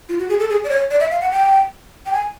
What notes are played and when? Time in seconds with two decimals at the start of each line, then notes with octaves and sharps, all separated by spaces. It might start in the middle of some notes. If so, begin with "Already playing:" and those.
0.09 F4
0.19 F#4
0.29 G#4
0.40 A4
0.50 G#4
0.64 D5
0.70 C#5
0.91 D5
1.00 E5
1.11 F5
1.21 F#5
1.32 G5
2.06 G5
2.13 G#5